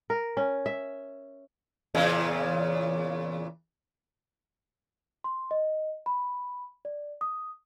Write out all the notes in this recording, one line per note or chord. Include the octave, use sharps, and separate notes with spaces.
A#4
C#4
E5
E2 A#2 C#3
C6
D#5
B5
D5
D#6